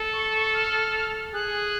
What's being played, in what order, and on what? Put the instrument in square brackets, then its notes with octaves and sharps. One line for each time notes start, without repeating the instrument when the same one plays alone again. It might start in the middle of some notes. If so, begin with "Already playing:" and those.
Already playing: [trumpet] A4
[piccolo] C#6
C#6
F6
[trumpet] G#4 [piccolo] F#6